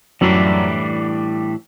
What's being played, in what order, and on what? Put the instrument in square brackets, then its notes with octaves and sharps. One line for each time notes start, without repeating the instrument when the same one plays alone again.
[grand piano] F#2 [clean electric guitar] A2 E3 G3 D4